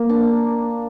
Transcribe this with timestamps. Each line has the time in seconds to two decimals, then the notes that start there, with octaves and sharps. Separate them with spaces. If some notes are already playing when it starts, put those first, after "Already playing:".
Already playing: A#3
0.09 D4